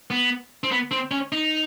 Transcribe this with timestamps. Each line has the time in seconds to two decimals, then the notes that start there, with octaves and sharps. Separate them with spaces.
0.10 B3
0.64 C4
0.71 B3
0.91 C4
1.11 C#4
1.32 D#4